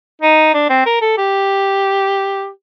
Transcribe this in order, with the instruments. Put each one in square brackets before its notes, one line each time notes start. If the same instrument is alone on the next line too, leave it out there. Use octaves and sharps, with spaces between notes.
[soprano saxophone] D#4
D4
C4
A#4
A4
G4